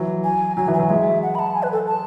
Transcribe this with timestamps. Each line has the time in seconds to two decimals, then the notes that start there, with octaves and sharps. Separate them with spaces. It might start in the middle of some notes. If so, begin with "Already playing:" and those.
Already playing: E3 F#3
0.24 G#5
0.57 F#3 G#5
0.68 E3
0.73 G#5
0.79 F#3
0.89 G#3 E5
1.23 F#5
1.35 B5
1.39 A5
1.55 G#5
1.63 B4
1.72 A4
1.87 A5